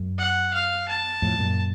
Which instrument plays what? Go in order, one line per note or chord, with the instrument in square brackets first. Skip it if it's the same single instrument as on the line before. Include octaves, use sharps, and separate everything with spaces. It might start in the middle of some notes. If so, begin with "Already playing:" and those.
Already playing: [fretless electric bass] F#2
[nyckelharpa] F#5
F5
A5
[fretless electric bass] F2 A2
F#2 A#2